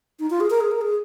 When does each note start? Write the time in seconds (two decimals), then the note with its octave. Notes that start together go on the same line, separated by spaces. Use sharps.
0.20 D#4
0.30 F4
0.40 G#4
0.50 A#4
0.61 G#4
0.71 A#4
0.81 G#4